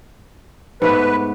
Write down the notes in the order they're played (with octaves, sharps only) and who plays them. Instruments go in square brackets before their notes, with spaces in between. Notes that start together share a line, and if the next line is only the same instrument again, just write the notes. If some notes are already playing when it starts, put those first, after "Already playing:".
[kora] G#2 A3 B3 [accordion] B4